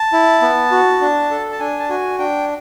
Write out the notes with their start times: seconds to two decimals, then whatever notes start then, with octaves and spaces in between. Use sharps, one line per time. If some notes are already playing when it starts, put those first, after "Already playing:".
Already playing: A5
0.13 E4
0.42 B3
0.71 F#4
1.01 D4
1.31 A4
1.52 A5
1.60 D4 G#5
1.79 A5
1.89 F#4 G#5
2.19 D4 G5